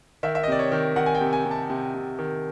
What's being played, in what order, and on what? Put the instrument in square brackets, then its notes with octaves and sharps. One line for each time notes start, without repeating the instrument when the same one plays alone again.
[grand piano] D#3 E5
E5
D#5
C3 D5
C#5
D#3
D#3 F#5
G#5
G5
C3
G#5
C3
A5
C3
C3
D#3